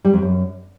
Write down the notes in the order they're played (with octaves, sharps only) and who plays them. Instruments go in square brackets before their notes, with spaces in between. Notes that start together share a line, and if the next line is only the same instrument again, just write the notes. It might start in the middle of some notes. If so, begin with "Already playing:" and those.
[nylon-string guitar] G3
F2
F#2